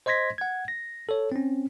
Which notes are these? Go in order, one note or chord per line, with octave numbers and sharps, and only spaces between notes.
C5 D#5 C6 G#6 A#6 B6
F#5 G#6
A#6
A4 C#5
C4 C#4